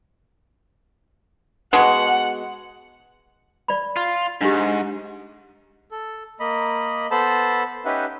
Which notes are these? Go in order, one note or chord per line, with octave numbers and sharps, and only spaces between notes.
B2 G#3 F#5
D5 B5
F4
G#2 D4 G4
A4
A#3 D#5 B5
B3 A4 C5 A5 B5
C#4 D#4 G4 B4 E5 F#5